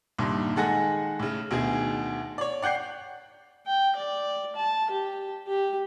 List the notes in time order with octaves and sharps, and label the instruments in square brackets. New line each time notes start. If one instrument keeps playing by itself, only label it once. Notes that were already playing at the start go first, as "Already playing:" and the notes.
[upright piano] C2 G2 A#2 D#3
D#3 G#3 A4 F#5 G#5 A#6
A2 C#3
D2 B2 D#3 G#4
C#5 D5
D5 F#5 G5 G6 C7
[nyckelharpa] G5
D5
A5
G4
G4